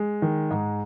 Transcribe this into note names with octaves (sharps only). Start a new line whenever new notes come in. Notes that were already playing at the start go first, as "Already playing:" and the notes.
Already playing: G#3
D#3
G#2